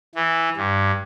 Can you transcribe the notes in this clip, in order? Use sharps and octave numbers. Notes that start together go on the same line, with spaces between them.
E3
G2